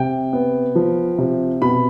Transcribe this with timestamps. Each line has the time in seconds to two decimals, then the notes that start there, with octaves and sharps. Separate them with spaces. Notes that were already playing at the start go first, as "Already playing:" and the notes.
Already playing: C3 G5
0.33 B3
0.75 F3
1.18 C3
1.62 B2 B5